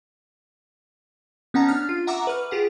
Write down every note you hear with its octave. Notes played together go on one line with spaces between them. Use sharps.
B3 C#4 D#4 F#5 A5 A#5
D4 F6
F4
E5 F#5 A#5 C#6 D6 E6
B4 F6
F4 G4 G#4 F#5